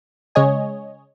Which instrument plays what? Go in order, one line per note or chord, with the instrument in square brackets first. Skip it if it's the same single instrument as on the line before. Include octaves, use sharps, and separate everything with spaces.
[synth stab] C#3 G#3 C#5 D#5 G#5